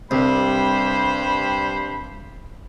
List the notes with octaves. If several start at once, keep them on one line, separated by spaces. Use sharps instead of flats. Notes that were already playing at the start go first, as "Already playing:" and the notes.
C2 G2 G3 C5 B5